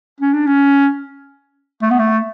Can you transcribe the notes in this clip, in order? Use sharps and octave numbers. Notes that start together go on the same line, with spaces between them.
C#4
D4
C#4
A3
B3
A3